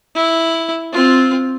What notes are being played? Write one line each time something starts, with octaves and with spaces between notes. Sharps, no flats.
E4
C4 F4